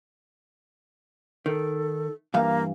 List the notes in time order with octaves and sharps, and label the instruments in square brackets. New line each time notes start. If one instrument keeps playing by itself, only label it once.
[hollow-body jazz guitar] D#3 [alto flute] A4
[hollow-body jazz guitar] G2 E3 F5 [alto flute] A#3